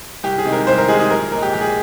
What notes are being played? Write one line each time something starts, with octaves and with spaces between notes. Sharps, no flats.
C2 G4
G#4
C3 D#3 G#3
A#4
C2 C5
A#4
C3 D#3 G#3 G#4
G#4
A#1 A#4
A#2 G#3 A#4
G4
A#1 G4
G#4